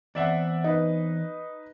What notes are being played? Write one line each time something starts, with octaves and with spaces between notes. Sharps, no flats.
E2 C4 D5 E5 F#5
D#4 B4